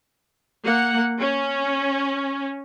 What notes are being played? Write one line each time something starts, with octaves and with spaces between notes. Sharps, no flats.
A#3 F#5
C#4